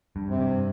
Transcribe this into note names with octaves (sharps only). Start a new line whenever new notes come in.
G2
C3
G2